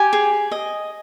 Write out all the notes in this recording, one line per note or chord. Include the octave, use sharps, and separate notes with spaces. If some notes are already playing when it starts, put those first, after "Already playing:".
Already playing: G4 G#5
G#4
D#5